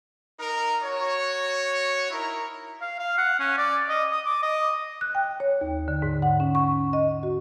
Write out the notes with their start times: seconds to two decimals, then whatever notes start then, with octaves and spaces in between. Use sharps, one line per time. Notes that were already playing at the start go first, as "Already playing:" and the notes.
0.39 D#4 A#4
0.83 F#4 C#5
2.11 D#4 E4 A#4
2.82 F5
2.99 F5
3.18 F#5
3.40 C#4
3.58 D5
3.89 D#5
4.11 D#6
4.26 D6
4.43 D#5
5.01 F#6
5.15 G5
5.40 C#5
5.61 D#2
5.88 D3
6.02 G#2
6.22 F#5
6.40 C#4
6.55 C#6
6.93 D#5
7.23 F#4